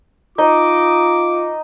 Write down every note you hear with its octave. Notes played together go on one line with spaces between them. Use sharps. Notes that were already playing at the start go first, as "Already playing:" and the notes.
D#4 F4 D#5 D6